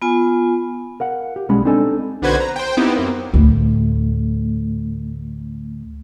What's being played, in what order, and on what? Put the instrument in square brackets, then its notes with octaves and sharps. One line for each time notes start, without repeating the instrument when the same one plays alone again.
[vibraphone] B3 F4 G#5
[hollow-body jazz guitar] A#4 F5 F#5
G4
B1 G3 G#3 C#4 B5
C4 D4 D#4 A4 G#5
[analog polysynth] B1 D3 F#4 B4 C5 G#6
A#5
C5 G5
B3 C4 D#4 E4 G4
F#2 A#3 C4
[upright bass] D2 A2